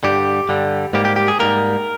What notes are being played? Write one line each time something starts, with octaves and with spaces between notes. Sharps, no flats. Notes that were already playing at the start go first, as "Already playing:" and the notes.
G2 D3 G3 G4
G2 D3 G3
G#2 G3 A#3 G4
G4
G4
G#4
G#2 G3 A#3 A#4